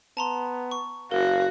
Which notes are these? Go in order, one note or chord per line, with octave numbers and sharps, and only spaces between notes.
B3 A5 A#5 C6
C#6
F#1 F#4 A#4 F5